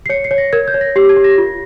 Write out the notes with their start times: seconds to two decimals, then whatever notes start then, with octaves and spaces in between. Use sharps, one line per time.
0.06 C7
0.09 C#5 C#7
0.24 C7
0.31 C#5
0.38 A#6
0.53 A#4 G#6
0.68 G6
0.74 C#5
0.81 A#6
0.96 G4 C7
1.09 G#6
1.17 G4
1.24 A#6
1.38 F4